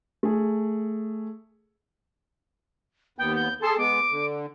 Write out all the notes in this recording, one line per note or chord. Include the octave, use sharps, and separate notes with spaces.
A3 G#4
D#2 B3 G5
G6
G#4 A4 A5 C6
G#3 B3 D6
D3